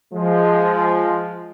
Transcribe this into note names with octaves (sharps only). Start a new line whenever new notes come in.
F3 G#3